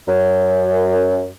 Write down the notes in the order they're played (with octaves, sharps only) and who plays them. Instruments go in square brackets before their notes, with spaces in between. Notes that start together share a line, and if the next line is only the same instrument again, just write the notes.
[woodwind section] F#2